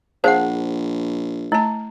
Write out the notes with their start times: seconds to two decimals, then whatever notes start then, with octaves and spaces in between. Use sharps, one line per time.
0.24 A#1 G#4 C5 F5 F#5 A5
1.52 A3 E4 A5